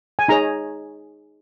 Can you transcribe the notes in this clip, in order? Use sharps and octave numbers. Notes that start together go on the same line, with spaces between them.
G#5
D#4 G#4 C#5 A#5